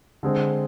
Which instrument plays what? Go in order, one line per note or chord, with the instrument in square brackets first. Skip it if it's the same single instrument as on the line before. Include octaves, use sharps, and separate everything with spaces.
[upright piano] D3 G#3 C4